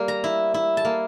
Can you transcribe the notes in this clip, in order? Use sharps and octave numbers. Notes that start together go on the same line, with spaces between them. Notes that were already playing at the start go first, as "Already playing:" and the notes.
Already playing: G3 A#3
A#5
E4
E4
A5
A#3